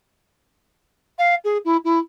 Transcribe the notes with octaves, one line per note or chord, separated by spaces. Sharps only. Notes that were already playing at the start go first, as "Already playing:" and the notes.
F5
G#4
E4
E4